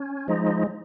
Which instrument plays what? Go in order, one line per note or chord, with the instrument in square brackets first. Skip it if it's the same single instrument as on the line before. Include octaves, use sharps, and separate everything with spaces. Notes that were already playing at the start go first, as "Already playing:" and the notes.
Already playing: [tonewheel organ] C#4
F3 G#3 D#4